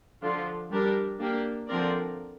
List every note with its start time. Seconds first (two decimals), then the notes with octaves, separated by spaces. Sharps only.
0.22 D3 F3 D4 F4
0.71 G3 D4 G4 A#4
1.20 A#3 D4 G4 A#4
1.68 D3 F3 C4 A#4 D5